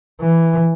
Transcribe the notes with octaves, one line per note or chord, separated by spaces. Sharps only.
E3